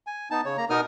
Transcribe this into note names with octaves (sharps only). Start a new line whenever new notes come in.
G#5
B3 D#4 A5
C#3 C#5
A#3 A#5
B2 B3 D#4 A#4 D#6 F6